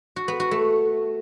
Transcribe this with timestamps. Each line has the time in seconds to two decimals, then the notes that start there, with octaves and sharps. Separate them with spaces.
0.16 F#4
0.28 B3
0.40 F#4
0.51 A3